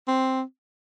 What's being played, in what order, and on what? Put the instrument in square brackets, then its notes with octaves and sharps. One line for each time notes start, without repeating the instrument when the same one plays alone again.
[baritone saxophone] C4